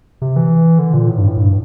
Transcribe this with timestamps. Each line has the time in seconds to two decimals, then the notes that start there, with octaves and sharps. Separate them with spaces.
0.22 C3
0.36 E3
0.79 D3
0.94 A#2
1.08 A2
1.18 G2
1.27 A2
1.37 G2